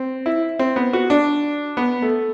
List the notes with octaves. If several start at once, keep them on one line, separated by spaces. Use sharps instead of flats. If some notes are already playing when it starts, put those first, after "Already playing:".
Already playing: C4
E4
C4
B3
F#4
D4
B3
A3